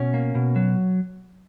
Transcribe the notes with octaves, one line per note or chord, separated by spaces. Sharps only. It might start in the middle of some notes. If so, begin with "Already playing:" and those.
Already playing: B2 C#4
A#3
B2
F#3